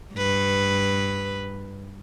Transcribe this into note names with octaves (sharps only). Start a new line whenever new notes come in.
G2 B4